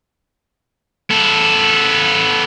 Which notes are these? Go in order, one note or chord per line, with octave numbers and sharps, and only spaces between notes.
B3 A4